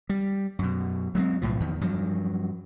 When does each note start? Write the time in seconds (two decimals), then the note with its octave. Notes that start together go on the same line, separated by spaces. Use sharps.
0.10 G3
0.59 F#2 B2
1.15 F#3 G#3 A3 C4
1.42 B1 A2 F3
1.60 E2 D#3
1.81 G2 F3 F#3